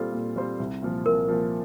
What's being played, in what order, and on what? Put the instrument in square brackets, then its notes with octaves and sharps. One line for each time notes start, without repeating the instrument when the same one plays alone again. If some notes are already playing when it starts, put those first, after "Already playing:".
Already playing: [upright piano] A#2 G3 C4 F4 C5 [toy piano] A4
[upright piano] A#2
G3 C4 F4 C5
C2
A#2 F3
[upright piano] C2 [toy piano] A#4
[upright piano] A#2 F3